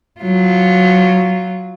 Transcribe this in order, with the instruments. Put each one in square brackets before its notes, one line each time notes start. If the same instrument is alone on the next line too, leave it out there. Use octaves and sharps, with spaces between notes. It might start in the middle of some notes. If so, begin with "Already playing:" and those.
[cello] F#3 F4